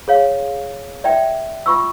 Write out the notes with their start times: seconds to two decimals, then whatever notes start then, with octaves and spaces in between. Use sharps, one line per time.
0.08 G#4 C#5 F5
1.04 D5 E5 G5
1.66 F4 C#6 E6